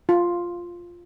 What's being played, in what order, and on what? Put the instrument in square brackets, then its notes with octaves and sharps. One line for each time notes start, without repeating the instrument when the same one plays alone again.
[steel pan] F4